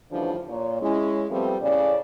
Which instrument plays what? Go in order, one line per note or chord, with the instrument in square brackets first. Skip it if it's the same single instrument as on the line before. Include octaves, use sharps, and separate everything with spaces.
[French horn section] D2 G2 C#3 E3 F3 D4
A#2 C#5
G#3 C#4 E4
F3 G3 A3 B3 C4
A2 C#3 C#4 D5